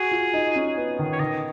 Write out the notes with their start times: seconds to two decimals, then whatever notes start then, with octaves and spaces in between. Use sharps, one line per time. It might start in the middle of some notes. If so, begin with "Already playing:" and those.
Already playing: F#4 G#4
0.12 F4
0.34 D#4
0.56 C#4
0.77 B3
0.99 D#3
1.13 C#5
1.20 D#3 D#5